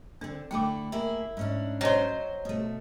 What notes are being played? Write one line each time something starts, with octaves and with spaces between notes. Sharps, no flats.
D3 C4 D4
D3 A3 E4 G5 D6
A#3 E4 G#4 E5
G#2 C#4 D4
F#3 C5 C#5 D#5 A#5
B2 A3